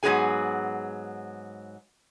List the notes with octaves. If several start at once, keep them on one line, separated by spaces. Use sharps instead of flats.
G#2 F#3 B3 G#4 G#5